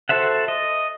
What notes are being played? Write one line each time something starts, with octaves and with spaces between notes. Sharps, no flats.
F#4 A4 C5 E5 F#5
D#5